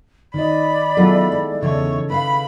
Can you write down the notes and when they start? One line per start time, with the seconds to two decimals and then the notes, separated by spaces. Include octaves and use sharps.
0.34 D#3 D5 D#5 B5
0.97 F#3 B3 E4 F4 G#4 A4
1.32 G#3
1.63 E2 C#3 E3 A4 C#5 D#5
2.10 B4 E5 F5 B5